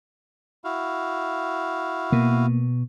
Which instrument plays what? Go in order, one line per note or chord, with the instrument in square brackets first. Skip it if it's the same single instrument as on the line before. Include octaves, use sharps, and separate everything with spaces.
[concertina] E4 F#4 F5
[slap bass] B2 [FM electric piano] A#3